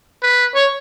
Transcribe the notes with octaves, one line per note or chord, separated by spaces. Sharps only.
B4
C#5